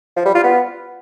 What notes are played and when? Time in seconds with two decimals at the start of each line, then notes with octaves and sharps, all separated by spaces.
0.17 F3
0.26 G3
0.35 F4
0.44 B3